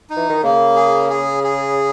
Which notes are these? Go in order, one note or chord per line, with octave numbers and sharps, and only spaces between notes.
D#4
E3
D#3
C#3 A#3
G#4
G#4
G#4